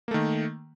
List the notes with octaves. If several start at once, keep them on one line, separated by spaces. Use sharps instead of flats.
D#3 A3 A#3